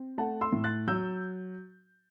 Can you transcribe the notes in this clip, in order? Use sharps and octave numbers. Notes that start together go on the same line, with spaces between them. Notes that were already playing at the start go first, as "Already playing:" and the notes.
Already playing: C4
A3 F#5 A5
C6 E6
A2
F#6 A6
F#3 E6 G6